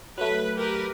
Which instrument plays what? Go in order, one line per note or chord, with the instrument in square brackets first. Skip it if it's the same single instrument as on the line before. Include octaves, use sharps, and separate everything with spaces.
[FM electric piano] F#3 A3 [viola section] B4
[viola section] G4 A#4 B4